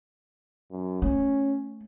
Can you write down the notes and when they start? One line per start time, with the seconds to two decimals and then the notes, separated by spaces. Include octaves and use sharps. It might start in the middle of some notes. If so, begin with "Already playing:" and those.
0.71 F#2
1.02 A3 C#4